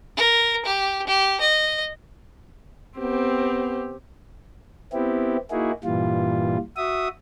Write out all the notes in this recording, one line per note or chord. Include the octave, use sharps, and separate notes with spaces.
A#4
G4
G4
D#5
B3 C4 G4
B3 C4 E4 G4
A#3 D#4 E4 F#4 G#4
G2 A#2 E3 G3 F4
F#4 E5 D#6